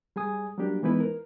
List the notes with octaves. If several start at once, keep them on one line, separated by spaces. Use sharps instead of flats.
G3 G#4 G#5 D#6
F#3 G3 A#3 D4 G4
E3 G#3 B3 D#4 E4 B4
A#4